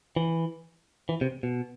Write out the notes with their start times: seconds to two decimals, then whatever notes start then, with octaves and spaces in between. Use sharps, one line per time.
0.16 E3
1.09 E3
1.21 C3
1.43 B2